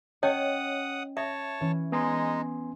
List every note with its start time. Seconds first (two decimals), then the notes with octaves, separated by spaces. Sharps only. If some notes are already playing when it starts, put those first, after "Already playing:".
0.23 C#4 C#5 D#5 F#5 G5 D#6
1.17 C#5 E5 A5
1.61 E3 C#4
1.92 G#3 B3 D#4 G#5 C6 D#6